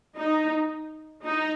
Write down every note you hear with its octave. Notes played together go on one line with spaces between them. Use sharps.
D#4
D#4